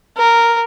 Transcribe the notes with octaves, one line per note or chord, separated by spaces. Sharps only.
A#4